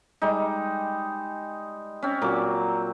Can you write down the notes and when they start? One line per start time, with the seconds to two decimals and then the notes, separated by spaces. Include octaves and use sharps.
0.22 G3 G#3 D#4
2.03 C4 C#4
2.22 A#2 F#3 D6